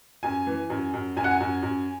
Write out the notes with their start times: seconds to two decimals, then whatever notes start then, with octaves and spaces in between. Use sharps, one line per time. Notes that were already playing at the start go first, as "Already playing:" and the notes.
0.23 F#2 G#5
0.47 E3
0.70 F#2
0.94 F#2
1.17 F#2 G#5
1.24 F#5
1.31 G#5
1.41 F#2
1.63 F#2